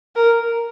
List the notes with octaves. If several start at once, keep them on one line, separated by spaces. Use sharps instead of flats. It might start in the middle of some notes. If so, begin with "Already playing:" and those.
A#4